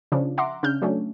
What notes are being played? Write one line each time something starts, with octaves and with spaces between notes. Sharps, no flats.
C#3 F3 D4
E5 F#5 A#5 C6 D6
C#3 D4 F6 G6
F#3 A3 C#4 D4